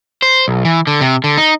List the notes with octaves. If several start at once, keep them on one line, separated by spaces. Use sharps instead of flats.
C5
B1
E3
D3
C3
D3
D#4